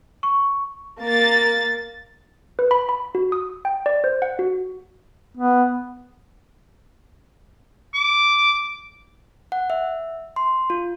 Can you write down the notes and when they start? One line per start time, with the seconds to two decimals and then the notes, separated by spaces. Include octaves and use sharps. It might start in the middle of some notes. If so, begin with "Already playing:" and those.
0.23 C#6
1.01 A#3 A6
2.59 B4
2.71 B5
2.89 B5
3.15 F#4
3.32 D#6
3.65 G5
3.86 D5
4.04 C5
4.22 F#5
4.39 F#4
5.37 B3
7.94 D6
9.52 F#5
9.70 E5
10.36 C6
10.70 F4